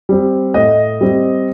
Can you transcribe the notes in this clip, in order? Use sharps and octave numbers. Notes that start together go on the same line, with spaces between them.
G3 C4
A2 D#5
G3 C4